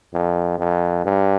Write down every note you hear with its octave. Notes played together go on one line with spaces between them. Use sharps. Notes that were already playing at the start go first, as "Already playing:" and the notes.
F2
F2
G2